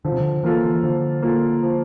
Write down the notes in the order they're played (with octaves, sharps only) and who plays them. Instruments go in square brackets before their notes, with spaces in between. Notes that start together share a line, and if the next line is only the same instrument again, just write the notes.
[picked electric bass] D3 [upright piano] F3
[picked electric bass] C3
D3
[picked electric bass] E3 [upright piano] A#3 F4 A4
[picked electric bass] D3 [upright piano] F3
[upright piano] A#3 F4 A4
F3